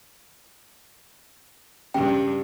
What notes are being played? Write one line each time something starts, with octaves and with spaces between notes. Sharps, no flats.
G2 C#3 G5